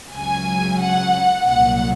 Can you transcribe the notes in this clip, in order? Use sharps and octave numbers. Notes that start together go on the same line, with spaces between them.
C#2 C#3 F#3 G#5
F#5
C2 A#2 F#3 F#5